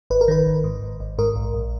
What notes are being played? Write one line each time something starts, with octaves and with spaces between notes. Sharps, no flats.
G#1 B4
A#4
D#3 B4
G#1
G#2
G#1
G#1
G#2 A#4
A#1
A#1